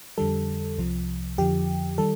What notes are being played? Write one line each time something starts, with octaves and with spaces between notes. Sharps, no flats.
F2 D3 G3 A4
C2 C3 F3
F2 D3 F3 G4
D#3 G3 A4